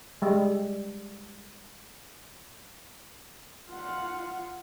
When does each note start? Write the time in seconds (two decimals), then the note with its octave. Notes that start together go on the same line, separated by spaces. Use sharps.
0.22 G3 G#3
3.70 F4 F#5